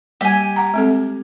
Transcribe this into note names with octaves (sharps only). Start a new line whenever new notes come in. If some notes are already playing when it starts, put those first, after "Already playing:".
G3 A#3 G4 G#5
F#5 A#5
G#3 C4 A4